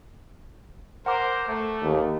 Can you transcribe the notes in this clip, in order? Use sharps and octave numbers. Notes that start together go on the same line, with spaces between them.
A#4 C5 F#5 D6
A3
D#2